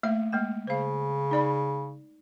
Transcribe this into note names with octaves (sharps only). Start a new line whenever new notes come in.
A3 A#3 E5
G#3 A#3 G5
C#3 C5 F5
D#4 D5 B5